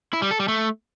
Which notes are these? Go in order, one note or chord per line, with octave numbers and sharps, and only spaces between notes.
E4
G3
A4
G3
A3